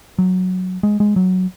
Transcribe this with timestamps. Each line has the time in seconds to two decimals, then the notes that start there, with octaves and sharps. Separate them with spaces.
0.18 F#3
0.83 G#3
1.00 G#3
1.16 F#3